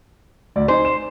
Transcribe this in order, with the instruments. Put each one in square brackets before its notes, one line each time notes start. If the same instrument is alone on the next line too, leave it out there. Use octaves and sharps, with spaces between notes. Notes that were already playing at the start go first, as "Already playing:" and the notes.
[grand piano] D2 D5
[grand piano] D#4 G#5 [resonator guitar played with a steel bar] C5
[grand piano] E7